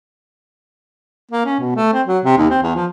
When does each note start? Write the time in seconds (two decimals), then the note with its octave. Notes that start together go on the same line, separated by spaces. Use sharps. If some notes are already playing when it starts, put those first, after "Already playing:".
1.31 A#3
1.45 C#4
1.60 B2
1.76 A3
1.93 C4
2.07 F#3
2.25 C3
2.38 D#2
2.50 C4
2.63 E2
2.75 F3